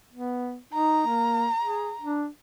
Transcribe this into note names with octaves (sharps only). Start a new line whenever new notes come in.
B3
D#4 A#5
A#3
G#4
D4